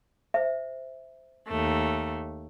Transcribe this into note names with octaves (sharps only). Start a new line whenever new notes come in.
C5 E5
D#2 A3